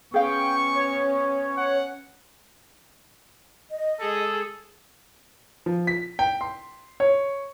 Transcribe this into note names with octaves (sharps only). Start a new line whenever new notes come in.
B3 C#4 G#4 F5 G5 C#6
C#5
F#5
D#5
G#3 G#4 A4
F3
B6
G5
C6
C#5